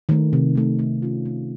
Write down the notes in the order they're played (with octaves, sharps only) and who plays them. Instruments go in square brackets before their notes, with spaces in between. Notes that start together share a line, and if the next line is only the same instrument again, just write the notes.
[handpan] D#3 A3 D#4
C3
D#3 A3 D#4
A3
C#4 F4
A3